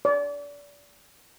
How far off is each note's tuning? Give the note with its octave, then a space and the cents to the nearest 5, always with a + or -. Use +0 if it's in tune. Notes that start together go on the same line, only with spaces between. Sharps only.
D5 -30